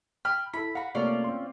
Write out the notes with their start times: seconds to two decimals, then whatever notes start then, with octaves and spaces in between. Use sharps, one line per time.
0.25 G5 B5 F6
0.54 E4 A4 B5
0.75 F#4 F5 B5
0.95 C3 A3 A#3 C#4 F4 D5
1.24 C4 C6